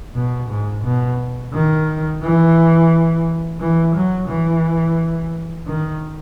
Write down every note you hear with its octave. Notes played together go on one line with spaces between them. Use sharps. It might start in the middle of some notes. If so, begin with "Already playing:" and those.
B2
G#2
B2
D#3
E3
E3
F#3
E3
D#3